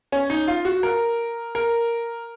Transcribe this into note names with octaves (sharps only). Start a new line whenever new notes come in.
C#4
D#4
F4
F#4
A#4
A#4